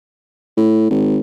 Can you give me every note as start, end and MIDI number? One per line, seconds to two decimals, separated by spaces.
0.57 0.87 45
0.90 1.20 32